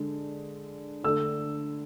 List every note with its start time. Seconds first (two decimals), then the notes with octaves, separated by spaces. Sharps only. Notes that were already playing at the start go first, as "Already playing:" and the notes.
Already playing: D3 G#3 D4
1.04 D3 A3 D4 E6